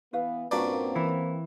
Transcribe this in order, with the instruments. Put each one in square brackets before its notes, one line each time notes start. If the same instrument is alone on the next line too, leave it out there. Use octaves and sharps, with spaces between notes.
[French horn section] E3 B3 [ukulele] E4 B4 F5
[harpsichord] G2 A#2 D5 [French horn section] A#3 C4 [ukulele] C#4 F#4
[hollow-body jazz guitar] E3 E4